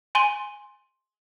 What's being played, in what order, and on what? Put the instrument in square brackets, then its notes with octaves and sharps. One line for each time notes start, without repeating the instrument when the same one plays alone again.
[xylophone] G#5 C6 D#7 G7